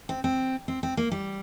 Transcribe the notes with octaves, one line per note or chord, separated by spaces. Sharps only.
C4
C4
C4
C4
A#3
G3